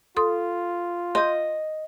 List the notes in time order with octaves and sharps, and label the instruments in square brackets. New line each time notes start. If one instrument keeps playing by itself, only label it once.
[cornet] F4 [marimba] A4 C6 D#6
[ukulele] D#5 [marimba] C6 G6